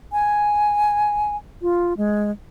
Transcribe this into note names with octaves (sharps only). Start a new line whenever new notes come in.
G#5
F4
G#3